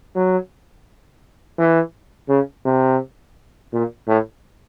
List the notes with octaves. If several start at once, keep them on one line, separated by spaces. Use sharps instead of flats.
F#3
E3
C#3
C3
A#2
A2